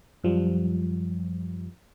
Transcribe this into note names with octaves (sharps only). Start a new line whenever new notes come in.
F#2 F3 G3